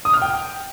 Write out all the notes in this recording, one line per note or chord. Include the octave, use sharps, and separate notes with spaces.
D#6
F6
G5